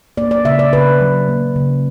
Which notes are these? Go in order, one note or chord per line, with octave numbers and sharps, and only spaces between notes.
A#3 D5
D5
C#3 E5
D5
C#3 B4
F#3
A#3
C#3